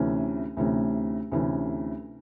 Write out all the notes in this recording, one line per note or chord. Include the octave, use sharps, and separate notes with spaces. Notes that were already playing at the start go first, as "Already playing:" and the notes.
Already playing: D2 C3 E3 A3 C#4
D2 C3 E3 A3 C#4
D2 C3 E3 A3 C#4